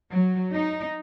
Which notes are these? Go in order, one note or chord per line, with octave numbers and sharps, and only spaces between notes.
F#3
D#4